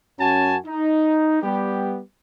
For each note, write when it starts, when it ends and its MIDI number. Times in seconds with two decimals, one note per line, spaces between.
0.19 0.56 42
0.19 0.56 61
0.19 0.56 66
0.19 0.56 80
0.19 0.56 81
0.66 1.39 63
1.42 2.01 55
1.42 2.01 59
1.42 2.01 67